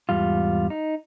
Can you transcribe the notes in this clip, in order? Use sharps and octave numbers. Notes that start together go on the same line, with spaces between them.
E2 G#2 G3 F4
D#4